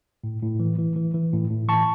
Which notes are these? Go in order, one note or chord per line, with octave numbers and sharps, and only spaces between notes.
A2
A2
E3
E3
E3
E3
A2
A2
E3 A5 C#6